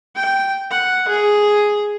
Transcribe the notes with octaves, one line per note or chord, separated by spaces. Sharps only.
G5
F#5
G#4